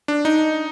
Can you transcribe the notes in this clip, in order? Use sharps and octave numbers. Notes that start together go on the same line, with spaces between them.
D4
D#4